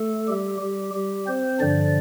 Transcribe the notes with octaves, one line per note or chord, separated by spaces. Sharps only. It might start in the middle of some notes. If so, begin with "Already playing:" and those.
Already playing: A3 A4
G3 G4
G3 G4
G3 G4
C4 C5
G2 D3 F3 D4 D5